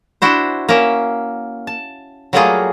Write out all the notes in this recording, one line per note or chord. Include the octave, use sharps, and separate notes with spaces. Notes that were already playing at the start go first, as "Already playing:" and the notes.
D4 E4 F#4 C5
A#3 C#4 A#4 E5
A5
F#3 G3 A3 A#3 F4 G#4